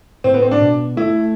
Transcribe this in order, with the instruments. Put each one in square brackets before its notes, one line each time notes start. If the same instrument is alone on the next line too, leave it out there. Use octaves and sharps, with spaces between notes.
[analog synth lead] A2 [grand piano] C4
[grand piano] B3
C4
D4
[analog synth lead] B2
[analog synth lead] A3 [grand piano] E4